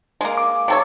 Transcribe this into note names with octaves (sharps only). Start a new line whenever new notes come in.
G#3 A#3
D6
C3 A4 C#5